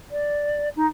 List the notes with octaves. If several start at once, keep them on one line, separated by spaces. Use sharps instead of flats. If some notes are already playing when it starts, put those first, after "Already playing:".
D5
D#4